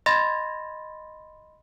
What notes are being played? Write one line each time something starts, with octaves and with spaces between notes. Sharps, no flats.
D#5 B5 C6 A6 A#6